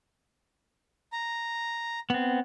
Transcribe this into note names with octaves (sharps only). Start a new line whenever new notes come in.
A#5
B3 C4